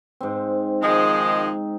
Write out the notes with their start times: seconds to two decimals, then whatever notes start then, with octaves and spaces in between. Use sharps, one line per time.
0.21 G#2 C4
0.82 D#3 F3 G#3 D#4